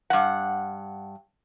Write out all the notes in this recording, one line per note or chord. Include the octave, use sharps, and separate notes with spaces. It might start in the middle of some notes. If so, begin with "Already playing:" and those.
G2 F#5